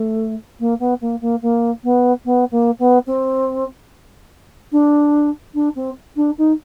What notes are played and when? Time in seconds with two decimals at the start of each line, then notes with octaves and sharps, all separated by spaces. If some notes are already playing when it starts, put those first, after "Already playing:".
Already playing: A3
0.59 A#3
0.79 B3
1.01 A#3
1.21 A#3
1.42 A#3
1.83 B3
2.25 B3
2.51 A#3
2.79 B3
3.06 C4
4.72 D4
5.54 D4
5.75 C4
6.16 D4
6.38 D#4